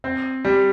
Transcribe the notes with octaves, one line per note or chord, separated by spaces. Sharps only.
C4
G3